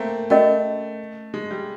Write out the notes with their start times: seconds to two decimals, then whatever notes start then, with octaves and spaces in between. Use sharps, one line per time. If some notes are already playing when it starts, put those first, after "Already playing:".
Already playing: A3 A#3 C4
0.30 A3 C#4 F#4 A#4 D#5
1.34 G#3
1.51 G3